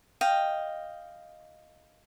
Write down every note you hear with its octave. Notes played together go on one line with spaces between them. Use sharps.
D#5 F5 G5